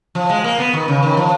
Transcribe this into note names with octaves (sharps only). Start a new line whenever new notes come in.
F3
G#3
A#3
B3
D#3
C#3
D#3
F3